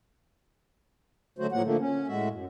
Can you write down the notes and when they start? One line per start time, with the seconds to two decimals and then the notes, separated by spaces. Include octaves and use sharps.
1.39 D3 F#3 A3 F#4 C5
1.52 A2 F3 F#3 A#3 F#5
1.63 D3 F3 A3 A#3
1.80 C#4
2.08 A2 G#3 F#4 E5
2.31 F#2